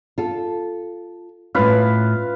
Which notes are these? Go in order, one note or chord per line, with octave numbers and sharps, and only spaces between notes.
F4 A4
A2 C#4 F4 B4 F5